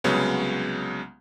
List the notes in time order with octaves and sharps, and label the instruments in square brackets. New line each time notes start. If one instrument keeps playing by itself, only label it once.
[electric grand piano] C2 C#3 F#3 G#3 B3